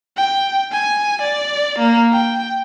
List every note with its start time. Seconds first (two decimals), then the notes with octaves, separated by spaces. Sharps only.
0.17 G5
0.72 G#5
1.21 D5
1.78 A#3
2.12 G5